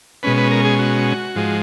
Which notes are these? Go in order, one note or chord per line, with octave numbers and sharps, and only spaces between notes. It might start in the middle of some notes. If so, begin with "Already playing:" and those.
B2 G#3 C#4 B4
B4
A#4
G#4
F#4
G#2 F3 G#3